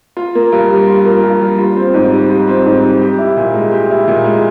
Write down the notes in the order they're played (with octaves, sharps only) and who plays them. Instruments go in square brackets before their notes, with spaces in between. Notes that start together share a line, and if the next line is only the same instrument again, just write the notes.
[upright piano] F4
A#3
G2
G3
F4
A#3
G2
G3
F4
C4
G#2
G3
F4
C4
G#2
G3
G4
E4
A#2
G#3
G4
E4
A#2
G#3